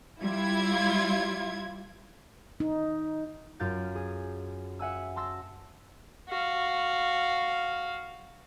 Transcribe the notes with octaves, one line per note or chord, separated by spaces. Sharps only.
G3 E4 F4 G#6
D#4
F#2 F4 G6 A6 D7
G#4
E5 F#5 G#5 E6
A5 C6 E6 A#6
F#4 F5